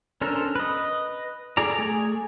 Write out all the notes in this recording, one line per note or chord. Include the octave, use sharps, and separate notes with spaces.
C#4 D4 A4 A#4 C5
B4 D#5
G#4 A4 D5 A#5
A3 G#4 G#5